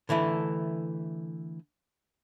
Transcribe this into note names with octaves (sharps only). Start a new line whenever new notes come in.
D3 E3 A3 E4